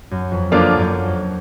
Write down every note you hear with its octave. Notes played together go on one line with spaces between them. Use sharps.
F#2
F2
F#2 D3 F3 A#3 D4 F4
F#2
F2